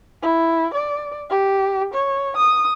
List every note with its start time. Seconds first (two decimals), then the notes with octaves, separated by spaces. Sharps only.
0.22 E4
0.73 D5
1.30 G4
1.93 C#5
2.36 D#6